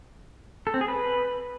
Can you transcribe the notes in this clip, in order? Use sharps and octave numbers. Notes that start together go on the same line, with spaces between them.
A4
C4
G#4
B4